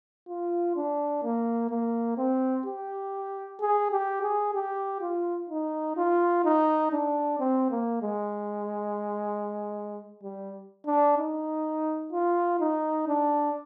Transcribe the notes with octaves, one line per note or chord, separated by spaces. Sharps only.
F4
D4
A#3
A#3
C4
G4
G#4
G4
G#4
G4
F4
D#4
F4
D#4
D4
C4
A#3
G#3
G3
D4
D#4
F4
D#4
D4